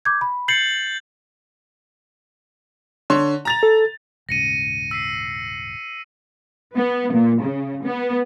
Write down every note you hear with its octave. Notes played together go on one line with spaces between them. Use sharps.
D6 G6 G#6
B5
G6 A6 C7 C#7 F#7
D3 C#5 C6
A#5 A6 F7
A4
D#1 G#2 C#3 A#6 C#7 D#7
E6 B6 C7
B3
A#2
C#3
B3